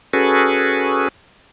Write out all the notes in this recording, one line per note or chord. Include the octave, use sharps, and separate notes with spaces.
C#4 F#4 G#4 A4 B4